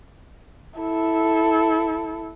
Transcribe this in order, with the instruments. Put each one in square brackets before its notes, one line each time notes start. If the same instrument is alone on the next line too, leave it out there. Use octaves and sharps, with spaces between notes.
[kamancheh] E4 A4